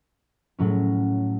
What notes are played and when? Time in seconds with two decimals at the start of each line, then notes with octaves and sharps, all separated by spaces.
0.59 A2 F#3 C#4